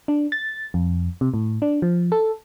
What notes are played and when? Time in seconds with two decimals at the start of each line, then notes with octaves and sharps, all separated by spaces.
0.08 D4
0.32 A6
0.74 F2
1.21 C3
1.34 A2
1.62 D4
1.82 F3
2.12 A4